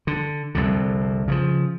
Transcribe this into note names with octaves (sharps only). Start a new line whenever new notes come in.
D3
C2 F2 D3
C#3 E3 F3